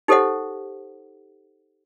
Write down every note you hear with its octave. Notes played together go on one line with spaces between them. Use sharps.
D#4 G4 A4 C5 D#5 F#5